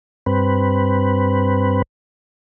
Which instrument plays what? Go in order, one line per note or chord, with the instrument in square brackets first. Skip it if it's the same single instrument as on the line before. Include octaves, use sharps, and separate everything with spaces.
[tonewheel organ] G2 C4 B4